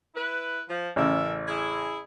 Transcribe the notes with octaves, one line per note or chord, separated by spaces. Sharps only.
E4 B4
F3
A1 C#3 A3 A#4 E5
E4 G#4